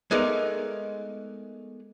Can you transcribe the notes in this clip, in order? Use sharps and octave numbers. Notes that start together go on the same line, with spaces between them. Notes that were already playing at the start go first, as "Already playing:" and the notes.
G#3 A3 B3 D#4 A#4 D5